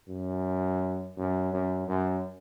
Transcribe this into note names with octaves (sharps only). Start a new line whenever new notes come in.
F#2
F#2
F#2
F#2